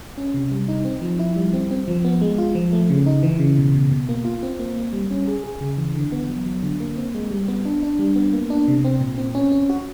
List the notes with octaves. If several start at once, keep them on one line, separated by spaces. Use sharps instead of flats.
C#4
C3
G3
D#4
C4
F3
E4
G3
C4
C4
F3
B3
G#3
F4
F3
A3
C#3
D#4
E3
C#3
B2
B2
B2
A#3
F4
C4
A#3
A#3
G3
C#4
G#4
G#4
C#3
E3
D3
B3
F#3
F#3
D3
A#3
C4
G#3
G3
B3
D4
D4
G3
B3
A#3
D4
C3
C4
A#2
C4
C#4
C#4
F#4